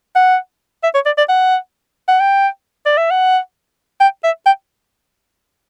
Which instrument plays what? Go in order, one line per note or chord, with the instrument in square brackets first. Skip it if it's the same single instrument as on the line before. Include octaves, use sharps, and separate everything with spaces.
[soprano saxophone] F#5
E5
C#5
D5
D5
F#5
F#5
G5
D5
E5
F#5
G5
E5
G5